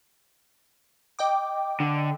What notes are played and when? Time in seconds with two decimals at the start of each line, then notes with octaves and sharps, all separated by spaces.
1.19 D#5 G5 D6
1.80 D3